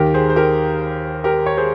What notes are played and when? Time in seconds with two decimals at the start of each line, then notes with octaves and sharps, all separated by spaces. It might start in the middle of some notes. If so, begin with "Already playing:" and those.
Already playing: D#2 D#3 G4 A#4
0.14 G#4 C5
0.29 C5
0.36 G4 A#4
1.24 G4 A#4
1.46 C#5
1.57 G#4 C5